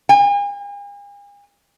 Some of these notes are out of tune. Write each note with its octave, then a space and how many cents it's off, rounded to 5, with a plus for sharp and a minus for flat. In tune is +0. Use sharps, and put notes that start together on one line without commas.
G#5 -45